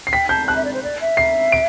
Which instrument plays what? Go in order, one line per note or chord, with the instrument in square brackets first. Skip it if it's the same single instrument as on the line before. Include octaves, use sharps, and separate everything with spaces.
[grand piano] C7
[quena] G5 [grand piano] B6
[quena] A5 [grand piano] G6
[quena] A5 [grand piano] F#6
[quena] E5
D5
C5
D5
E5
[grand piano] C7
D7